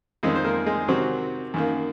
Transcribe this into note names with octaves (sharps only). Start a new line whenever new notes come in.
F2 D#3 G#3 C4 G#4
C5
A#3 A#4
G#3 G#4
C3 D#3 F#3 C4 F#4
F#2 D#3 A#3